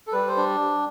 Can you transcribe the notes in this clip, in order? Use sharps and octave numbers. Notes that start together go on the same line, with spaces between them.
A4
G3 B4
C5
D4